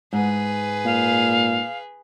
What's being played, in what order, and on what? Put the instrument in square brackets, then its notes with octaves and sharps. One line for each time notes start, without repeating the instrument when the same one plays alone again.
[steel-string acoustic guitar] G#2 [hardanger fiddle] G#4 B4
[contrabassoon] A#2 [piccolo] F5